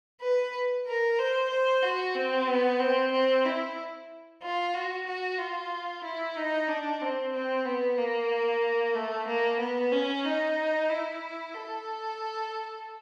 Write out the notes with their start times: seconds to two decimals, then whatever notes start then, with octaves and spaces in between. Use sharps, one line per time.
0.21 B4
0.86 A#4
1.19 C5
1.50 C5
1.83 F#4
2.15 C4
2.48 B3
2.80 C4
3.12 C4
3.45 E4
4.42 F4
4.74 F#4
5.06 F#4
5.38 F4
6.04 E4
6.36 D#4
6.68 D4
7.01 C4
7.33 C4
7.65 B3
7.98 A#3
8.95 A3
9.28 A#3
9.60 B3
9.92 C#4
10.24 D#4
10.90 E4
11.54 A4